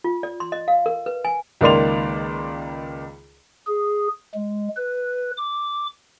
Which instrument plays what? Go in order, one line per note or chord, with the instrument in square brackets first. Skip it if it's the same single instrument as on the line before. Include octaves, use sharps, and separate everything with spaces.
[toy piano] F4
D5
C6
D#5
F5
A#4
B4
G#5
[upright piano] C#2 D#3 A#3 D5 C6 F7
[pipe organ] G#4
G#3
B4
D6